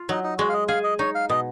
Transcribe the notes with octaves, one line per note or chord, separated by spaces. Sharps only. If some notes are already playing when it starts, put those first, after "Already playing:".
Already playing: F4
F#3 D#4
D#4
G#3 F#4
F5
D#5
G#4 F5
D#5
D#4 C#5
F5
B2 D#5